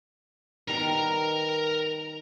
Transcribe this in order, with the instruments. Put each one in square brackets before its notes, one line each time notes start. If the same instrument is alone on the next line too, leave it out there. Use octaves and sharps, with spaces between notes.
[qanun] D#3 G3 B3 [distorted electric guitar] A#4 A#5